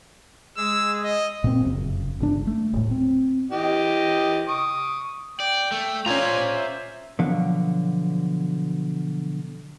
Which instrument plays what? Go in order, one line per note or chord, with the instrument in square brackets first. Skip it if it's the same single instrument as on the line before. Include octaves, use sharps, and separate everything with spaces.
[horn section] G#3 G#4 [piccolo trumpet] E6
[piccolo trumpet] D#5
[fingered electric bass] A#2 C4
F1 F#2 C#3
G1 C#3 D4
A3
D#1 A2
C4
[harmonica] E3 G4 D#5
C#6 D#6
[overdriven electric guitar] D5 [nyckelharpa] G5
[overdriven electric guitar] A3
[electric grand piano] C#4 F4 [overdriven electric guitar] C5 A#5 [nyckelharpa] D5 G#5
[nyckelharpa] E5
[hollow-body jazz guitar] B2 D3 F3 F#3 F5